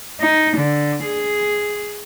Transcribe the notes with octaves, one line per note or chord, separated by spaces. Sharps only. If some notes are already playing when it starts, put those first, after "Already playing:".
D#4
D3
G#4